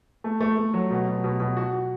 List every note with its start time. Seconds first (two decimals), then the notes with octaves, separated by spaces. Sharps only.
0.24 A3
0.41 A3
0.57 A3
0.74 F#3
0.91 B2
1.07 B2
1.24 B2
1.40 B2
1.57 F#4
1.73 F#4